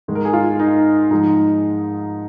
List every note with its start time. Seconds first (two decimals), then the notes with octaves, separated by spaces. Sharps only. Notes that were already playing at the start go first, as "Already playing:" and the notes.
0.08 G#2 D#3 G#3
0.15 A#4
0.25 G#4
0.33 F4
0.59 D#4
1.11 G#2 F3 G#3 D#4